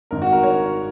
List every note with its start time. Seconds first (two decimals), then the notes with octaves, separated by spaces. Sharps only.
0.11 G#1 G#2 D#3 A#4
0.22 F#4
0.33 A#4
0.43 C#5